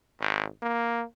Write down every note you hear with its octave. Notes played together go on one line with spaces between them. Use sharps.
G#1
A#3